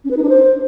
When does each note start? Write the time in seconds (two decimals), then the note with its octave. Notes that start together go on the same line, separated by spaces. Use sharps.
0.04 C#4
0.11 B4
0.17 D#4
0.23 D4
0.29 C5